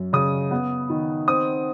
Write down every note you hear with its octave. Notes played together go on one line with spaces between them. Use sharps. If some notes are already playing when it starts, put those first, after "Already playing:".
Already playing: F#2
C#3 D#6
B3
D#3
C4 D#6